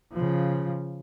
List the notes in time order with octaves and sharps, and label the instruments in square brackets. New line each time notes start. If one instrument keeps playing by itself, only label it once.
[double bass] C#3 F3